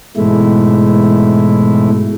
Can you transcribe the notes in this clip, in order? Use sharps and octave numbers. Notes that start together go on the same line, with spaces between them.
G#2 B2 E3 G#3 A3 E4